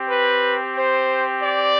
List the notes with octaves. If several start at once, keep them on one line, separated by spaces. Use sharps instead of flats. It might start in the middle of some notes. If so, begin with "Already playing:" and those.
Already playing: C4 G4
B4
C5
D5